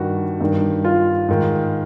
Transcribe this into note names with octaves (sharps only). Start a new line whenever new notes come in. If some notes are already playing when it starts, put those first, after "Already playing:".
Already playing: G2 D#3 F#4
G2 D#3
F4
G#2 D#3